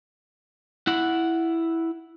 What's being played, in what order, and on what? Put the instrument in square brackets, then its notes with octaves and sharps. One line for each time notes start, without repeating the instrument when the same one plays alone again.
[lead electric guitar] E4 F#5